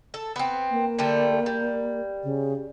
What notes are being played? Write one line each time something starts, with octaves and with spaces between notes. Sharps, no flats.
A4
B3 C4
A#3
D3 G3 A3
G3
C#3